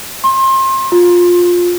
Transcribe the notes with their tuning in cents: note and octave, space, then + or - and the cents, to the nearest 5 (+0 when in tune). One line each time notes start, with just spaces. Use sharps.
C6 +30
F4 +15